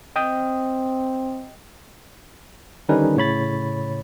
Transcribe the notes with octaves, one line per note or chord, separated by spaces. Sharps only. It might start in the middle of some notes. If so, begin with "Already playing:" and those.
C4 D#5 G5 D#6
D3 D#3 G3 C#4 D#4 B4
A2 C#3 C#5 B5 A6